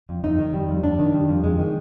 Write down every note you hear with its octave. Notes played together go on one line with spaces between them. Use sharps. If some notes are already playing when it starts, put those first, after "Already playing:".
F2
F2 D#4
D#3
G3
F2
F2 D4
D#3
G3
F2
F2 G#3
D#3